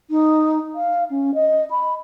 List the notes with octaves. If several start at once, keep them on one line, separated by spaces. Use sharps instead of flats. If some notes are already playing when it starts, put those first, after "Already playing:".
D#4
F5
C#4
D#5
B5